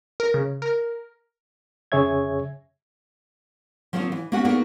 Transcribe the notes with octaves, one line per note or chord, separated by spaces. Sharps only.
A#4
C#3
A#4
F2 C#3 G#4 C#5 E5 G#6
F3 F#3 A#3 C4 D#4 F4
E3
A#3 B3 C#4 F#4 B4 F#5
A#3 B3 D#4 F#4 G#4 A#4